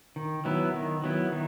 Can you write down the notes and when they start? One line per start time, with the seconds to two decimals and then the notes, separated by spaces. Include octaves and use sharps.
0.16 D#3
0.45 F#3 B3 E4
0.74 D#3
1.04 F#3 B3 E4
1.32 D#3